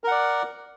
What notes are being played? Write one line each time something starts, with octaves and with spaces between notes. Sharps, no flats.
A#4 D5 F#5